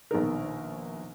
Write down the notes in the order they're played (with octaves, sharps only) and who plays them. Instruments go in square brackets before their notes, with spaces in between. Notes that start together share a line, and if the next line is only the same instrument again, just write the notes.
[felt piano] A#1 B2 D#3 A#4